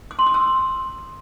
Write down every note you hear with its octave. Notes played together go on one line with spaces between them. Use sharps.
D#6
C6
D#6
E6